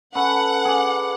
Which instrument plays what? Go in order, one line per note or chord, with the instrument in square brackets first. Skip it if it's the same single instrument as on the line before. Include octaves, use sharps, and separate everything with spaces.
[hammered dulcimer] C#4 A4 B4 [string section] F#5
[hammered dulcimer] G#4 B4 D5